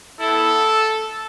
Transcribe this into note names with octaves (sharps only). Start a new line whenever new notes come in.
B3 E4 A4